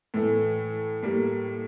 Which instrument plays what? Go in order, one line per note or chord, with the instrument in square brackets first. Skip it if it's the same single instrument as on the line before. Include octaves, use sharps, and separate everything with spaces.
[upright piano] A2 E3 A3
A2 G3 A#3